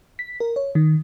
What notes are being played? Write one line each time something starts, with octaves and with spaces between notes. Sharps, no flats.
B6
A#4
C#5
D#3